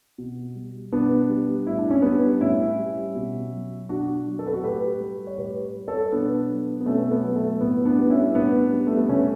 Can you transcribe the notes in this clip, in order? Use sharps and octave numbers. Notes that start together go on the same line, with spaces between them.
B2
G3
B2 B3 D4
G3
A2 E4
D4
C#4
G3 B3 D4
A2 C#4 E4
G3
B2
F#3
B2 D4 F#4
F#3
A4
B4
F#4 A4
A2 G4 B4
G3
C#5
A2 G4 B4
G3
A4 C#5
B2 B3 D4
F#3
B3
B2 A3 C#4
A3
B3
F#3
A3
A2 B3
B3 D4
G3
C#4 E4
A2 B3 D4
G3
A3
B3
C#3 A3 C#4